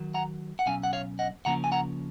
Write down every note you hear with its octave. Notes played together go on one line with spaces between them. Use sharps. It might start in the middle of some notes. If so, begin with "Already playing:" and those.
Already playing: D#3 F#3
F#5 A#5
F#5
B2 F#3 C#4 F5 G#5
F#5
C#5 F5
D#5 F#5
C#3 F3 A#3 C#4 F#5 A#5
G#5
F#5 A#5